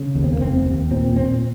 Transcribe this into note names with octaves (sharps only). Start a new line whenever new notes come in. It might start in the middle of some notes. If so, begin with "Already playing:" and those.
Already playing: C#3
D#2
C4
A#3
F1 C4
D#2
A#2 C4
A#2 C4